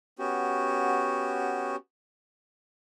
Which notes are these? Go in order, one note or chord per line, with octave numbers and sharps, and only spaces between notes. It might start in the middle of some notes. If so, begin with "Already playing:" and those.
B3 C#4 F#4 G4